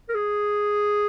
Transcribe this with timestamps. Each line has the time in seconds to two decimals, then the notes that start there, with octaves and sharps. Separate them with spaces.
0.09 A#4
0.14 G#4